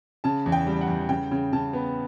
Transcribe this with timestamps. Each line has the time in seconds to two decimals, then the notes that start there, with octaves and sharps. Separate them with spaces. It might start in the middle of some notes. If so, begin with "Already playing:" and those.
0.24 C#3 A5
0.46 E2
0.52 G5
0.67 G3
0.81 F#5
0.88 E2
1.09 C#3 G5
1.31 C#3
1.53 C#3 A5
1.73 B3